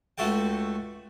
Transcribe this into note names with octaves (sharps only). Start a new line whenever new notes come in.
C#2 A3 F#4 A4 G5